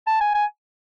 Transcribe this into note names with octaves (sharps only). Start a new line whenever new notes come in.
A5
G#5
G#5